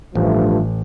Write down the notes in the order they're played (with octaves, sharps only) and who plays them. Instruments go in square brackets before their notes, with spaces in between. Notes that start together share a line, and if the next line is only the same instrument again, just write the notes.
[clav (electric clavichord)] A1 [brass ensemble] G2 F3 A3